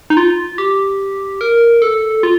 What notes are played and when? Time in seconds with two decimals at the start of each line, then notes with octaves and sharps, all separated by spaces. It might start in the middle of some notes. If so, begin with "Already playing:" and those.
0.10 D#4
0.17 F4
0.58 G4
1.41 A#4
1.82 A4
2.23 F4